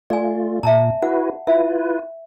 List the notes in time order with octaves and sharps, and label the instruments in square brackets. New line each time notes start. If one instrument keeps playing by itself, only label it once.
[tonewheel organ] A3 F4 [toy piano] D5 G#5
[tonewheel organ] A#2 [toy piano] E5 A5 A#5
[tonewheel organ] E4 F#4 B4 [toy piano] F#5
[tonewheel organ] E4 F4 B4 [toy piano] E5